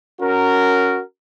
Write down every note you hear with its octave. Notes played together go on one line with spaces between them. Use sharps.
C#4 F#4 A#4